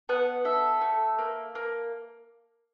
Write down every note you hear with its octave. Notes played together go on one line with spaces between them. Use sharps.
B3 F#5
A4 E5
A3
A#3
A#3